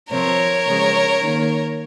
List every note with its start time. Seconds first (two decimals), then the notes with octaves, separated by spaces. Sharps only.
0.10 C3 F3 C4 A#4 C#5
0.66 C#3 F3 G#3
1.21 D#3 A#3